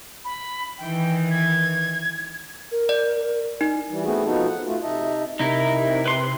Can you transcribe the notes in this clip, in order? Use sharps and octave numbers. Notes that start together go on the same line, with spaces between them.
B5
D#3 E3 E4 G5
G#6
A#4
D5
D#4
E3 G3
A3 B3 C4 F#4 G#4
B2 F3 B3 D#4 F#4 A4
F#5
A3 F4 F#4
C3 D#4 D#5 E5 A5
C3 D#4 E4 A#4
B4 C6